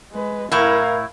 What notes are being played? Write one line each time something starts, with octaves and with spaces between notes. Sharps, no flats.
G#3 B4
A2 E4 A#4 F5